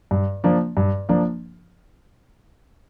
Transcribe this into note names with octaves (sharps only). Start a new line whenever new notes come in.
G2
F3 A#3 D4
G2
F3 A#3 D4